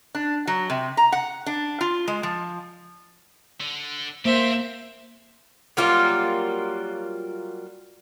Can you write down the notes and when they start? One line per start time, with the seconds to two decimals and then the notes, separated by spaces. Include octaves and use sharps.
0.15 D4
0.47 F#3
0.70 C3
0.97 A#5
1.12 F#5
1.46 D4
1.81 F4
2.08 G#3
2.23 F3
3.61 D3
4.25 A#3 C4 G4 C5 E5
5.77 F#3 G3 A#3 F4